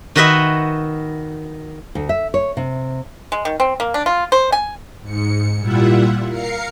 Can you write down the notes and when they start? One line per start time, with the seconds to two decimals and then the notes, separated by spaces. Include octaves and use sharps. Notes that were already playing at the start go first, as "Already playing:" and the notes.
0.16 D#3 F#4 B4 D#5 E5 F#5
1.95 D2
2.09 E5
2.34 C#5
2.57 C3
3.32 G#3
3.45 D#3
3.60 C4
3.80 A#3
3.94 D4
4.06 F4
4.32 C5
4.52 G#5
5.01 G#2 C#7
5.59 A#2 G3 E4 F4 E5 F#5
6.29 A#4 F5 C7 C#7